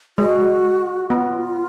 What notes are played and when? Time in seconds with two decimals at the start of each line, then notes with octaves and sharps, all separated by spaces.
0.18 G#3 F#4
1.10 B3 F4 F#4